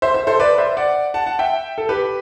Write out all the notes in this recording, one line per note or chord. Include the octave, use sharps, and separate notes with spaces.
C5 E5
C5 E5
A4 C5
B4 D5
C5 E5
D5 F#5
F#5 A5
F#5 A5
E5 G5
A4
G4 B4